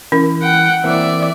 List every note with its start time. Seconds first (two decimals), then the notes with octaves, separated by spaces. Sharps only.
0.12 E3 C#4 A#4
0.42 F#5 G5
0.84 E3 A#3 C4 D5 E5